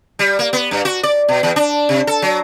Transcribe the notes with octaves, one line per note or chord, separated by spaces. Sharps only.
G3
A#3
B3
G2
F#4
D5
B2
E2
D4
C3
A4
F#3